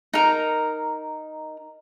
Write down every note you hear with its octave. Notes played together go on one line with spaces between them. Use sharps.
D#4 A#4